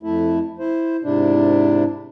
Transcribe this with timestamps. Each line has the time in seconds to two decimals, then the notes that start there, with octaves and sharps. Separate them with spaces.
0.03 F2 A3 E4
0.59 E4 C5
1.04 G#2 C3 D4 E4